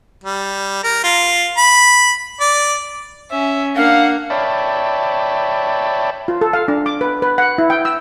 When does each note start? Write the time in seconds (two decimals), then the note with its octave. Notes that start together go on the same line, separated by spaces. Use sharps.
0.24 G3
0.84 A#4
1.04 F4
1.57 B5
2.40 D5
3.31 C#4 E5
3.76 A#3 D4 F5 F#5
4.30 C#5 D5 E5 G5 A5 B5
6.28 F4
6.41 A4
6.53 F5
6.68 D4
6.86 D6
7.01 B4
7.22 B4
7.38 F#5
7.58 E4
7.70 G5
7.85 E6